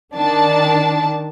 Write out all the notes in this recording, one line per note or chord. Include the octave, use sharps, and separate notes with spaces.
D#3 D4 A5